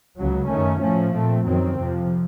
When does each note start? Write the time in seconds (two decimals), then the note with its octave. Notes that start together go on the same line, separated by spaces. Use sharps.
0.17 C#2 C#3 F#3
0.49 F#2 D#3 A3 C#4
0.82 A2 F3 A3 C#4
1.14 A#2 A3 C4
1.46 F#2 D#3 F#3 C4
1.79 F2 C3 F3